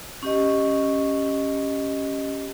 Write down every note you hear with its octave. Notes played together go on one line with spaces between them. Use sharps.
C#4 G4 D#5